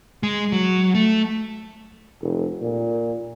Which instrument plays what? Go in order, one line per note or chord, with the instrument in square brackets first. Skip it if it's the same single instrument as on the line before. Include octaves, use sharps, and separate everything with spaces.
[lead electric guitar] G#3
F#3
A3
[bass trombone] F1
A#2